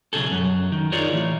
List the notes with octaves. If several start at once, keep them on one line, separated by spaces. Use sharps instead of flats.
B1 F2 C#3 G#4 A4
F#2 F#3
D#3
D#4 F4 G#4 A#4 C#5 D5
A2 E3